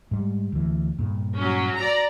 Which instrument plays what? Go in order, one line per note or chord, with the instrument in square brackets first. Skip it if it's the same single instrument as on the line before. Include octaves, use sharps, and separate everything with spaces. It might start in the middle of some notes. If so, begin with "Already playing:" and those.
[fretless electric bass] G#2 G3
D2 E3
G2 A#2
[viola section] F#3 C#4
D5 A#5